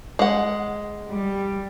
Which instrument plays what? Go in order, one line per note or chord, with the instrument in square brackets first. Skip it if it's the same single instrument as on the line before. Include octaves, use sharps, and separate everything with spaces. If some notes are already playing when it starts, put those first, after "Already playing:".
[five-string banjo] G#3 F#5
[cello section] G3